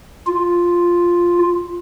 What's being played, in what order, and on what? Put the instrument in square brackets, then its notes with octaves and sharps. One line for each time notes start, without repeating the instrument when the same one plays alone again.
[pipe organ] F4